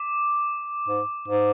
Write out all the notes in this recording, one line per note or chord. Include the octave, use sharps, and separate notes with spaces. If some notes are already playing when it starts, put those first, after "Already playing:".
Already playing: D6
G#2
G#2